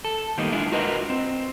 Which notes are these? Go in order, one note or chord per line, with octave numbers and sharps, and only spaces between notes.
A4
D#3 G3 A#3 B3 D#4
G#3 D4 E4 F4
F4 F#4 A#4 B4 D#5
C4